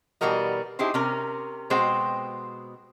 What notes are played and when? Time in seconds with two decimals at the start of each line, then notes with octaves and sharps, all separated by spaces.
0.21 B2 E3 G3 F#4 A#4 D#5
0.79 D#4 E4 G4 G#4 C5
0.94 C3 C#4 A#4
1.70 B2 G#3 C4 F#4 C5 G5